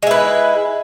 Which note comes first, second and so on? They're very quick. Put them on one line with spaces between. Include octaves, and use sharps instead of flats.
G#3 E4 B4